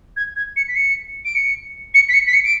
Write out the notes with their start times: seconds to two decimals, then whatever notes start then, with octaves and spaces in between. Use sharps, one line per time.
0.16 G#6
0.36 G#6
0.56 C#7
0.68 B6
0.75 C#7
1.25 D7
1.35 C#7
1.94 C#7
2.09 B6
2.13 C#7
2.26 B6
2.33 C#7
2.44 D7